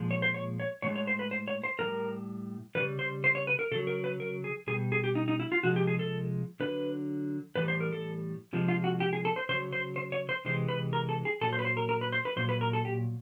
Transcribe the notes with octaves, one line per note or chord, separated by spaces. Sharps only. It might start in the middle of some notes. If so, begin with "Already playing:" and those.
Already playing: A#2 F3 G#3
C#5
C5
C#5
C#5
A2 E3 G#3 C#5
C#5
C5
B4
C5
C#5
C5
A2 E3 G3 A#4
C#3 E3 G3 B4
C5
C5
C#5
B4
A#4
C#3 F#3 A4
A#4
B4
A#4
G#4
B2 G3 G#4
G#4
G4
D#4
D#4
E4
F4
C3 F3 G#3 F#4
G4
G#4
A4
D3 F#3 B4
A2 E3 G3 B4
C5
A#4
A4
C3 F3 G#3
F4
F#4
G4
G#4
A4
C5
C#3 F#3 C5
C5
C5
C#5
C5
C3 E3 G#3 C5
B4
A#4
A4
G#4
A#2 F#3 A4
C5
B4
C5
A#4
A#4
B4
C5
B4
A#2 F#3 C5
B4
A#4
A4
G4